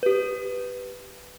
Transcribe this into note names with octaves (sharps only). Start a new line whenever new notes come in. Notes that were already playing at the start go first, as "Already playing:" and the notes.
G4 B4